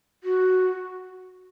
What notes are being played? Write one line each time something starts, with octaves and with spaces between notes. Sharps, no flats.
F#4